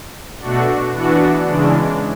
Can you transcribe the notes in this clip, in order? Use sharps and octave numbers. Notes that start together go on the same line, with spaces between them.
B2 A3 D4 F#4
E3 B3 D4 F#4
C#3 E3 G#3 D4